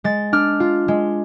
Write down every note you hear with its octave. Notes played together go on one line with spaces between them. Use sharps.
G#3 A6
D4 F6
F4
G#3